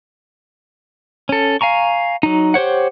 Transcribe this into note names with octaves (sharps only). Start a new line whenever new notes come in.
C#4 A4
F5 G#5 A#5 C#6
F#3 D#4
G4 C5 C#5 F#5